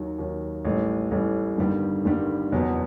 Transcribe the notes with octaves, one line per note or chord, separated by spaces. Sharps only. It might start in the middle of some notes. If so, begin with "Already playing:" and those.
Already playing: D#2 D#3 F#3
D#2 D#3 F#3
A1 A2 G3
A1 A2 G3
G1 G2 D#3 G3
G1 G2 D#3 G3
F#1 E2 B2 F#3 B3